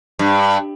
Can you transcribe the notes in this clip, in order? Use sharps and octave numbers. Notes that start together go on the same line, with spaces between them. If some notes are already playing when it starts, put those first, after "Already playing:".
G2